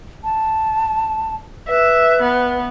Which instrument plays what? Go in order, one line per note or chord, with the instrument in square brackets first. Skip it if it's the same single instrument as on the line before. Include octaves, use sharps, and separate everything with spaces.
[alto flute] A5
[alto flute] B4 [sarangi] E5
[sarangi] B3